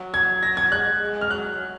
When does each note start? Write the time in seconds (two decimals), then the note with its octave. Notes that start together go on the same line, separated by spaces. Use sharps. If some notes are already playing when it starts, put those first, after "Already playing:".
Already playing: F#3
0.14 G#6
0.43 A#6
0.57 G#6
0.72 G#3 F#6
1.01 G#3
1.21 F6
1.31 F#3 F#6